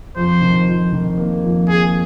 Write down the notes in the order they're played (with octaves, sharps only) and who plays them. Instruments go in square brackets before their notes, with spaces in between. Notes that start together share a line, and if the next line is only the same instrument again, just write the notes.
[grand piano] F2 [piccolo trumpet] C5
[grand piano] D#3
F2
D#3
A#3
F2
[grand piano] A#3 [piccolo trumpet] G#4